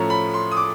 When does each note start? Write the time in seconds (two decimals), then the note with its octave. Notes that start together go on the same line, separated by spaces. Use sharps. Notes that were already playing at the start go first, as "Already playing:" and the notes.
Already playing: A2 F3 A3 C#4 A#5
0.10 B5
0.34 C6
0.51 D#6
0.57 D6